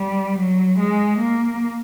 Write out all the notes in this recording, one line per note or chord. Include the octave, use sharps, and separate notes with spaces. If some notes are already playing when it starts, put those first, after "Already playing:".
Already playing: G3
F#3
G#3
A#3